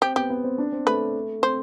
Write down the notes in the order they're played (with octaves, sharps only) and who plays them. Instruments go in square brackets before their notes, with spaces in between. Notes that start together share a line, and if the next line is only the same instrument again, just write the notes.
[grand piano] C4 [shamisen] G4
[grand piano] B3 [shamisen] G4
[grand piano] B3
C4
D4
C4
[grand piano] A3 [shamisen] B4
[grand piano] C4 [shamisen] C5